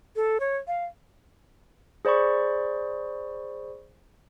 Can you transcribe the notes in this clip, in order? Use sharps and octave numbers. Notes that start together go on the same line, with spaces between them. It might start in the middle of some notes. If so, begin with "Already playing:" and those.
A4
C#5
F5
G#4 C5 D5 B5 C#6